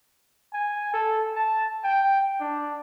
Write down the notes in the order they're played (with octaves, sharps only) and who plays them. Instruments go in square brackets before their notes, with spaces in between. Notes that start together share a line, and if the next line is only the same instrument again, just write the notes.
[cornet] G#5
A4
A5
G5
D4